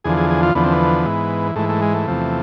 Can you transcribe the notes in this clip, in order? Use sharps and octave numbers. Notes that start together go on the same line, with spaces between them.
E2 D3 F3 G#4
G#4
G#4
F4
E2 D3 F3 B3
C4
B3
G#2 E3
G#2 E3 A3
A3
G#3
A3
E2 C3 F3